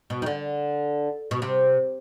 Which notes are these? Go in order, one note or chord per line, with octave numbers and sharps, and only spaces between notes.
B2
D#3
D3
B2
C3